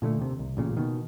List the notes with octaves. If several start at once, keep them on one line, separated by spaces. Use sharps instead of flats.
A#2 D3 F3 A3
D#2 C3
C2
A1 A#2 C#3
B2 D#3